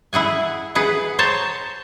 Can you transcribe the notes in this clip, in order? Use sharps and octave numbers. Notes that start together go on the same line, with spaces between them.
E4 G#4 F#5 G#5
G#4 B4 F#5
C5 C#5 A5 A#5